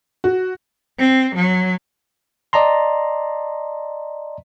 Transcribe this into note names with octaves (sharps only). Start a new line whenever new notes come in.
F#4
C4
F#3
D5 D#5 A5 A#5 C6